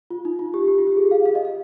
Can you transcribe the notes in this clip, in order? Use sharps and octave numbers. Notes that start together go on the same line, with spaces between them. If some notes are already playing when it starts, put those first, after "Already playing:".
F4
D#4
F4
G4
G4
F4
G4
G#4
F5
F5
D#5
F5